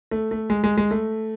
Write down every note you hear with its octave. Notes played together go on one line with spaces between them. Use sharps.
A3
A3
G#3
G#3
G#3
A3